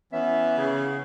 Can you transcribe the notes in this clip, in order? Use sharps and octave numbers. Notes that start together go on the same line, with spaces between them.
E3 B3 C#4 E5
C#3 G#4